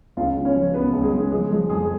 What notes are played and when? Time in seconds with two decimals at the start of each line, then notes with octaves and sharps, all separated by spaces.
0.17 C#2 F4 F5
0.36 C#3
0.45 C#4 C#5
0.55 F3
0.74 C#2 B3 B4
0.93 C#2
1.03 G#3 G#4
1.13 C#3
1.31 F3 G#3 G#4
1.51 F3 G#3 G#4
1.70 F2 G#3 G#4